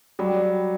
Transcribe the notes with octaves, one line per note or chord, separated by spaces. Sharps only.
F#3 G3